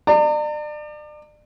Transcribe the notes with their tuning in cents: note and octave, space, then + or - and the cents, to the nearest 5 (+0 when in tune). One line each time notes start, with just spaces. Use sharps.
D5 +35 A#5 -40